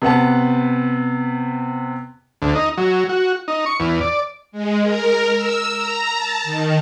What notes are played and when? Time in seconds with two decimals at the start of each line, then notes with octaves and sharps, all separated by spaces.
0.02 C3 B3 F#5 A5
2.42 D2
2.55 D#4
2.78 F#3
3.09 F#4
3.48 D#4
3.66 C#6
3.80 E2
4.01 D5
4.52 G#3
4.82 A#4
5.34 E6
5.73 A#5
6.14 A5
6.44 D#3